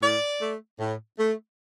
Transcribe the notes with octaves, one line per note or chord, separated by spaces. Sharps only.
A2 D5
A3
A2
A3